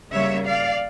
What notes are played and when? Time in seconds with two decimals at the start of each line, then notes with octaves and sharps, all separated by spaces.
0.12 C#3 G3 A#3 C#5 E5
0.46 D5 F5